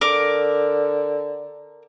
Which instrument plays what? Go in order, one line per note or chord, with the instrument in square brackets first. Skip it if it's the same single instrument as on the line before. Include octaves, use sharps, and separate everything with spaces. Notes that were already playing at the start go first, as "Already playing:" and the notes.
[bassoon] D3 [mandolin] A#4 D6